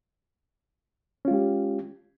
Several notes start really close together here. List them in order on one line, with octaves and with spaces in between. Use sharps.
C#4 F4 G#3 G4